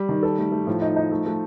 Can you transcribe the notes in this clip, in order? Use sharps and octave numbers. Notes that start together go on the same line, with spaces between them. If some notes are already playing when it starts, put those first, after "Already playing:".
Already playing: G3
D#3
A4
A3
A3
A2 F3
D#4
D#4
A3
A3